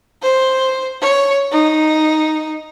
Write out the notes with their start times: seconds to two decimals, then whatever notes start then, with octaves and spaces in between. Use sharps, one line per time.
0.22 C5
1.01 C#5
1.52 D#4